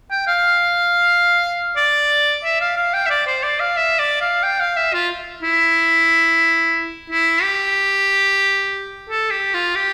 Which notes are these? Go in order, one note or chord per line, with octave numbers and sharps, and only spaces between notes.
G5
F5
D5
E5
F5
F5
G5
E5
D5
C5
D5
F5
E5
D5
F5
G5
F5
E5
F4
E4
E4
G4
A4
G4
F4
G4